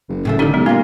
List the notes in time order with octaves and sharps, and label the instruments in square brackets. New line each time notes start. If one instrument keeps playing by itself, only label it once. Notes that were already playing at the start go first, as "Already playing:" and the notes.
[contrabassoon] F#1
[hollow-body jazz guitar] A2 C#3 A3
[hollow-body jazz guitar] D3 D#3 [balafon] D#4 G4 A4
[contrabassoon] B1 [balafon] G#3 D#4
[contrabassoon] A#2 [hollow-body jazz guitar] A#3 F4 [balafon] B3